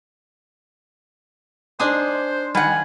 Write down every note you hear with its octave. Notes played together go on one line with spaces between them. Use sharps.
D4 D#4 G#4 C5
D#3 G3 F#5 G#5